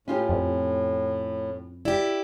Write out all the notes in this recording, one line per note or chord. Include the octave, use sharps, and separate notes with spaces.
A2 C#4 F4 G4
F2
E4 G4 D5